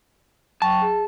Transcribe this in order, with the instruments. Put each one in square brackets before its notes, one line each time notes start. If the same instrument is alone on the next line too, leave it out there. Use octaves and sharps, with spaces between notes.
[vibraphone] F#3 G5 C#6 [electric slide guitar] A5
[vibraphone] G#4